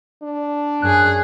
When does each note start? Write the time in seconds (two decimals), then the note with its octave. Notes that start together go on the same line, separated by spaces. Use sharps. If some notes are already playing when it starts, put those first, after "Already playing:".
0.23 D4
0.82 F#2 G#4 F#6